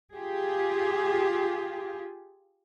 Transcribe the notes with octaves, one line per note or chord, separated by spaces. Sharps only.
F4 G4 G#4